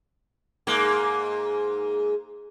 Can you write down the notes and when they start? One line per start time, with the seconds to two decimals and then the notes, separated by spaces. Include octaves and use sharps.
0.67 G#2 A#3